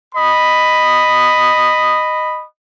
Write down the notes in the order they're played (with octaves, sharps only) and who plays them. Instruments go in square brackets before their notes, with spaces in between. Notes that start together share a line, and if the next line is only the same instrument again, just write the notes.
[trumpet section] D#5 B5 D#6